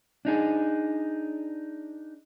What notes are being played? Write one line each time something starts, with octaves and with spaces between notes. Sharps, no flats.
D4 D#4 G#4